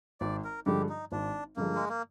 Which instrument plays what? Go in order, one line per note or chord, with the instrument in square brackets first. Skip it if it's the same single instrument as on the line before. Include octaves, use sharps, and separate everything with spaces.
[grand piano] G#1 [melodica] D5
[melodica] A#4
[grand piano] G2 D3 F3 G#3 [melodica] G4
[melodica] D#4
[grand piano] G#1 [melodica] D4
[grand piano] G2 D3 F3 G#3 [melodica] A#3
[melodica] G#3
A#3